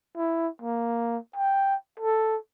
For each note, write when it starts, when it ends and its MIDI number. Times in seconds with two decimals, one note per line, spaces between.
0.16 0.48 64
0.62 1.17 58
1.36 1.75 79
2.00 2.37 69